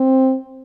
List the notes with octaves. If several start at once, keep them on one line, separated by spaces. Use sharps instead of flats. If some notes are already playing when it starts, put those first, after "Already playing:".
Already playing: C4